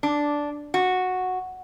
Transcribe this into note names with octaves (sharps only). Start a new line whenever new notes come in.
D4
F#4